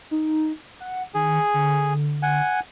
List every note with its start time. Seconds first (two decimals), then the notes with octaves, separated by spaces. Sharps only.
0.11 D#4
0.80 F#5
1.14 D#3 G#4
1.54 D3
2.22 F#5 G#5